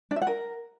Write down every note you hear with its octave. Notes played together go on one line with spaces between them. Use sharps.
D4
E5
F#5
A#4